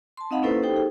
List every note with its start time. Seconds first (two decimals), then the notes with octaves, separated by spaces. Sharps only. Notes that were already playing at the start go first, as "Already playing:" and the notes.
0.17 A5 C6
0.31 C4 D#4 D#5 F5 F#5 B5
0.43 A#3 C#4 E4 A4 B4 C5
0.63 D#4 G4 A4 C5 G5
0.76 G#4